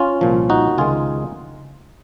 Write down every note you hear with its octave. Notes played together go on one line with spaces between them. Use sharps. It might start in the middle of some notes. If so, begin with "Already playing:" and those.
Already playing: C#4 F4
C2 A#2 F3
D#4 F#4
C#2 C3 D#3 G#3 F4 G#4